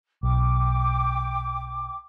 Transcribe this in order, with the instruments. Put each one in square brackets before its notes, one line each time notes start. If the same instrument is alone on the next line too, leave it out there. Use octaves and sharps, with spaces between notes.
[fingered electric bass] B1 [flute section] G5 D6